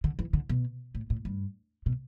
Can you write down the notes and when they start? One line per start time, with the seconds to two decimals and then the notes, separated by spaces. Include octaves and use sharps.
0.04 D3
0.19 E3
0.33 D3
0.49 B2
0.95 A2
1.10 A2
1.25 G2
1.86 B2